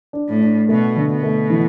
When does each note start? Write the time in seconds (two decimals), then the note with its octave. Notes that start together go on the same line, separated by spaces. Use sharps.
0.13 D4
0.28 A2
0.41 D4
0.69 B2 A3
0.96 D3
1.10 B2
1.23 A3
1.50 E3